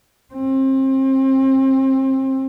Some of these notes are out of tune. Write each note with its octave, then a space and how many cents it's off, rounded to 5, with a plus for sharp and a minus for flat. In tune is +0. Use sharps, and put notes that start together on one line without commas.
C4 +30